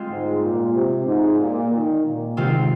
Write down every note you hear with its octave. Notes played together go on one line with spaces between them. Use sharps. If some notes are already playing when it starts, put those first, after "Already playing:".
Already playing: G#3 C4 F4
G#2
A#2
C3
G#2
A#2
D#3
A#2
G#2 C3 D#3 G#3 C4 F4